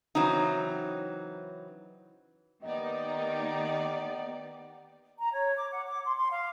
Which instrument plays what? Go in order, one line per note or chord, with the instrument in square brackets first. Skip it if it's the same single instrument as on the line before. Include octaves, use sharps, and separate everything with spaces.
[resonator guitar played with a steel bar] C#3 E3 F#3 C4 D#4
[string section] D#3 A#3 D#4 [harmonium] B3 [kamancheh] G4 D5 [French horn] D#5
[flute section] A#5
C#5
D6
F#5
D6
C6
C6
F5